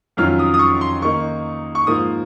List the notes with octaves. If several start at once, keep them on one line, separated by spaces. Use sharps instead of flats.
F2 D#3 F#3 C#4 F4 F6
D#6
D#6
C#6
C6
D#3 A#3 D#4 C#6
C#6
G#2 F3 A#3 D#6